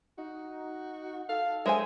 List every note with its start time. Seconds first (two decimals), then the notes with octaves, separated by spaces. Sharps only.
0.18 D#4 F#4
1.29 A4 F5
1.66 G#3 C5 E5 G#5